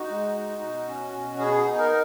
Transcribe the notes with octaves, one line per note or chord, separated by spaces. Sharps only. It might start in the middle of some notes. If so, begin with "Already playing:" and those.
Already playing: D#4 F#4
G#3
D#4
B2
C#4
B2
B3 G#4
D#4
A#4